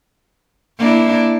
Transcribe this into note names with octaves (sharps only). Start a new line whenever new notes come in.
A#3 D4 E4